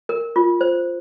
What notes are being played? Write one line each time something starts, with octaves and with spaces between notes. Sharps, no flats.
A#4
F4
C5